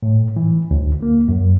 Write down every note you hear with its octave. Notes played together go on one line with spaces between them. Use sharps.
A2
E3
D2
A#3
F#2